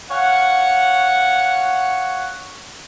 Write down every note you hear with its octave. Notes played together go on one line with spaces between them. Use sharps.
C#5 F5 F#5